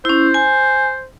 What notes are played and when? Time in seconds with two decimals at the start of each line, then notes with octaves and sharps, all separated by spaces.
0.05 C#4 E4 C5
0.34 G#5